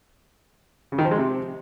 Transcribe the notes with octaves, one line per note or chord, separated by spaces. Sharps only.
C#3
D#3
F3
G#3
C3